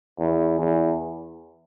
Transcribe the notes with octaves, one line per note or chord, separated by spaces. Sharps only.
E2
E2